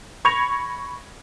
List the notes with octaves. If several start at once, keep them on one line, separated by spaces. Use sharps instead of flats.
B5 C#6 G#6 A#6 C#7 F7